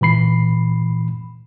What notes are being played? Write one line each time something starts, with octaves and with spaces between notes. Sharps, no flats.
A#2 E3 B5 C7